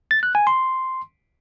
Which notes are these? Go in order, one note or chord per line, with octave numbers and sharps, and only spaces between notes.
A6
F#6
G#5
C6